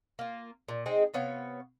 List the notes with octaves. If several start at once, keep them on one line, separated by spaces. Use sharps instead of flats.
A#3 F4
A#2
G#3 C4 D#4 G#4
C3 B3 C#5 F5